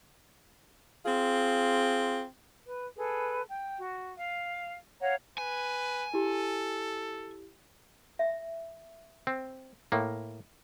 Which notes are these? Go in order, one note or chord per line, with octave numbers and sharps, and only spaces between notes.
C4 F4 G#4
B4
G#4 A4 B4
G5
F#4
F5
C#5 F5 F#5 A#5
B4 G#5
E4 G4 A4
E5
C4
A2 A#3